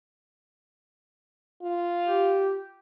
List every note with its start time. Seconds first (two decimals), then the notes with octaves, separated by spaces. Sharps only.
1.62 F4
2.07 G4